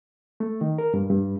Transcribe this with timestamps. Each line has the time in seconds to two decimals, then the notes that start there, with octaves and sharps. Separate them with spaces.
0.40 A3
0.61 D#3
0.78 A#4
0.94 G2
1.10 G2